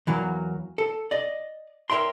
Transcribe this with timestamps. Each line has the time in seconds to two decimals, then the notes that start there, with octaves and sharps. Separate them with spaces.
0.07 E2 E3 F#3 A#3
0.78 A4
1.11 D5 D#5
1.90 A#4 C#5 E5 G5 C6